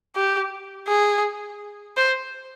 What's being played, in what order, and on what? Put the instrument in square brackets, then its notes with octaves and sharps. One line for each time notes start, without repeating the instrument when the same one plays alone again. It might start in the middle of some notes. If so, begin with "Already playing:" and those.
[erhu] G4
G#4
C5